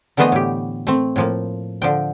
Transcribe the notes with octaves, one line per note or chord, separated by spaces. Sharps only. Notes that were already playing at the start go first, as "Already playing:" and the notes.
D3 E3 A3 B3 C5 D#5
A2 G4
A3 C4
A2 F3 A#3
D3 F3 G5